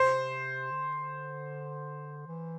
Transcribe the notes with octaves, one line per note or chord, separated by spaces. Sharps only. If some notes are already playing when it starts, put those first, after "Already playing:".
Already playing: C3 C5
D3
E3